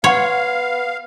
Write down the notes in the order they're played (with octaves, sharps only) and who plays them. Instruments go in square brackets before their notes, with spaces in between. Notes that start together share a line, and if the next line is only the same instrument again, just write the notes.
[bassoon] B3 [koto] C#5 [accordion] F5 [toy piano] F#5 C6